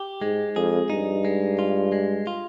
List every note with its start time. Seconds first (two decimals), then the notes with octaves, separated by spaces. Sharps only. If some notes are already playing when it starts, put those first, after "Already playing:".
Already playing: G4
0.22 G#2 G#3
0.56 F2 G#4
0.90 G2 D#4
1.25 G#3
1.59 F4
1.92 G#3
2.27 F4